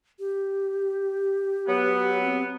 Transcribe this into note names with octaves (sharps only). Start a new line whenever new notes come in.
G4
F#3 B3
C4